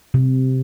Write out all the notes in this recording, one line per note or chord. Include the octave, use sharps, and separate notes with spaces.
C3